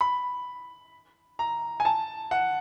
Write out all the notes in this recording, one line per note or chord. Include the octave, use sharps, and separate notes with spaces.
B5
A#5
G#5
A5
F#5